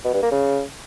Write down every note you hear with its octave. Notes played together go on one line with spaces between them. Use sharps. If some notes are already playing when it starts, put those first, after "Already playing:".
B2
G2
A#3
C#3